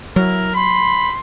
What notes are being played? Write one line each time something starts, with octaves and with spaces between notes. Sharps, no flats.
F#3 E4 A#4
B5 C6